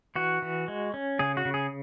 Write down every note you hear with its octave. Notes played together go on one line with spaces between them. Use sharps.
E3 F#4
E3
G#3
C#4
C#3 G#4
F#4
C#3
G#4